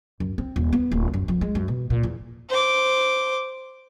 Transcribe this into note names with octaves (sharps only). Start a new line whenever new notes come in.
F#2
C4
D#1
B3
D1
F#2
F2
G#3
F#2
B2
A#2
E2
C5 D6